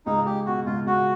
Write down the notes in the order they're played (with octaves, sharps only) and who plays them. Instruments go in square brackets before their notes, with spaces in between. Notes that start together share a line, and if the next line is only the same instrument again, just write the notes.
[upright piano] C#2 [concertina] D#4
[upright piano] G#3 [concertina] G4
[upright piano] B2 [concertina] F#4
[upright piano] C#2 [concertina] F4
[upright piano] C#2 [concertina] F#4